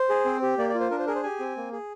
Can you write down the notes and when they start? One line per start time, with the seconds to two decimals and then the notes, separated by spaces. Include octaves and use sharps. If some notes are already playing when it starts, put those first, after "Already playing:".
Already playing: C5
0.09 G#4
0.25 C4
0.42 G4
0.58 A#3 D5
0.69 D5
0.74 F4
0.80 C5
0.91 D4 A#4
0.99 C5
1.07 G#4 A#4
1.15 C5
1.23 G4 G#5
1.40 C4
1.57 A#3
1.72 G#4